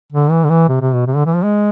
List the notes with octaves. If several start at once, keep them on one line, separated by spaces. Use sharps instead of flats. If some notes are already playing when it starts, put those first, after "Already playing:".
D3
E3
D3
E3
C3
C3
B2
C3
D3
E3
F3
G#3